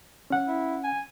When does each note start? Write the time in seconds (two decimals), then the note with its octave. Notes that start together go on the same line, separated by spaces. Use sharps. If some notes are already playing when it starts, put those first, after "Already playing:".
0.30 C#4 F#5
0.48 E4
0.84 G#5